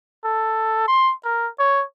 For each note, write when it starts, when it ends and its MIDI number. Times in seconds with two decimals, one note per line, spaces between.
0.25 0.88 69
0.88 1.13 84
1.25 1.48 70
1.59 1.84 73